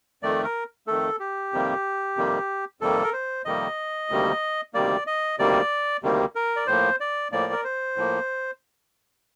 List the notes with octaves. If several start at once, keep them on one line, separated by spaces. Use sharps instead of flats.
F2 D#3 A3 D5
A#4
F2 D#3 A3 A4
G4
F2 C3 D#3 G3 A#3
F2 C3 D#3 G3 A#3
F2 C3 D#3 G3 A#3 A4
A#4
C5
F2 C3 D#3 G3 A#3 D#5
D2 C3 D#3 G3 A#3
D2 C3 D#3 G3 A#3 D5
D#5
D2 C3 D#3 G3 A#3 D5
D2 C3 D#3 G3 A#3
A#4
D5
A2 F3 A#3 C5
D5
A2 F3 A#3 D5
A#4
C5
A2 F3 A#3